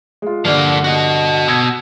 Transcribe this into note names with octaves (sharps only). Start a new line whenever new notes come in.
G#3 F4
G2 D3 F3 A#3
F#4 D#5
B2 E6 G#6